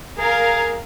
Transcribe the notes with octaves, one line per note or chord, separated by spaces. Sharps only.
G#4 A#4 F5